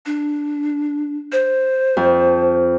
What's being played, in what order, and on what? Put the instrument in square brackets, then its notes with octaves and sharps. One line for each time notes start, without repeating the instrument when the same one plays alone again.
[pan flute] D4
C5
[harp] F2